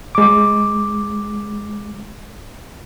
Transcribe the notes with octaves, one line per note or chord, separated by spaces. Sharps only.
G#3 D6